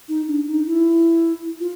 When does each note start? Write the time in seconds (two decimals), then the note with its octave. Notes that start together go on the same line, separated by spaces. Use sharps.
0.09 D#4
0.27 D4
0.47 D#4
0.66 E4
1.60 F4